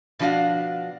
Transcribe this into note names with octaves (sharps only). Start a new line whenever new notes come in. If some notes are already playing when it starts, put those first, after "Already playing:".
B2 F3 D4 F#4 F5